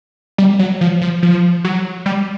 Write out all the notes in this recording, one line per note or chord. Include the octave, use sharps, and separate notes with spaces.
G3
F#3
F3
F3
F3
F#3
G3